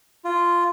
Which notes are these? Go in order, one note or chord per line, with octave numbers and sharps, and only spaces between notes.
F4